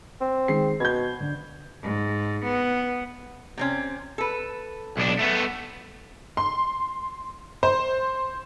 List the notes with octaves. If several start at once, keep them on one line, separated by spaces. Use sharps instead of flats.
C4
D#3 G#3 C7
B2 G6 G#6
D3
G#2
B3
C3 C4 C#4
A4 B4
B1 D4
A3 B3
C6
C5